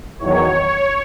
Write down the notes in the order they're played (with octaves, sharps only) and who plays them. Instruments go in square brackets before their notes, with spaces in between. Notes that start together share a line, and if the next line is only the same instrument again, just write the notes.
[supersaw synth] E2 D#3 F#3 C#5